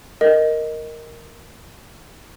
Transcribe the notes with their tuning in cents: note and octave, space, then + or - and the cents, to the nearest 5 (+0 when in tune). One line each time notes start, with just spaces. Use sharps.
A#4 +0 D#5 +0